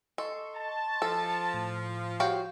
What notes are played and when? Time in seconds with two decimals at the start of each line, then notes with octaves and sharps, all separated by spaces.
0.18 A4 D#5 C6 C#6
0.54 A5
1.02 F3 A4
1.54 A2
2.20 F#4 G4 C#5 F5 G5